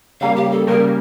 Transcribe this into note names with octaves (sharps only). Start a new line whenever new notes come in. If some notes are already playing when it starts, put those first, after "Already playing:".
C#3 G3 A#3 F5
G4
A4
C#3 G3 A#3 A#4